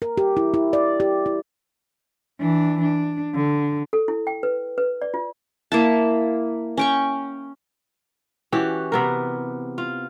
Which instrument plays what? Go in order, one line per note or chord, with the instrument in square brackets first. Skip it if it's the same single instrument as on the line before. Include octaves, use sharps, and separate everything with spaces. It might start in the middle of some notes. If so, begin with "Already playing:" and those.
[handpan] A#4
G4
E4
E4
D5
G4
E4
[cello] E3 D4
D4
D3
[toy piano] A4
E4
G5
B4
B4
D5
F4
[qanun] A#3 E4 A5
C#4 G5 C#6
[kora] E3 C#4 F#4 G4
C3 B3 A#4
F4